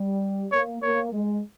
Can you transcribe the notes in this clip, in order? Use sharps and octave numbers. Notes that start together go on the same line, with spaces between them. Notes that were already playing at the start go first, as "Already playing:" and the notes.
Already playing: G3
A#3 C#5
A#3 C#5
G#3